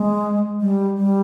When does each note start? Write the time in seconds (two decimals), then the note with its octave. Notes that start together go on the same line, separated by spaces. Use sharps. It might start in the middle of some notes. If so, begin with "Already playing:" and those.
Already playing: G#3
0.61 G3
0.98 G3